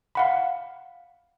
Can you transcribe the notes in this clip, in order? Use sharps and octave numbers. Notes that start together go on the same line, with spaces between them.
F5 F#5 B5